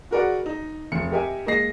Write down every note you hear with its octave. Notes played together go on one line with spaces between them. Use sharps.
F#4 G#4 A#4 B4 D5 F#5
D#4
F1 C#7
G4 A#4 D#5 E5 G#5
G#3 A#3 G#4 D#5 A#6 C7